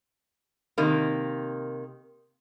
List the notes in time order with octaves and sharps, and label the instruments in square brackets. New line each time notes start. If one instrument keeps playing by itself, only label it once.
[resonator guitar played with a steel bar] C3 D#3 A#3